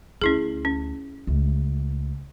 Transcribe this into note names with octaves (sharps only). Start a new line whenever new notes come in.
D2 C#4 E4 G#4
C#4
C#2 A3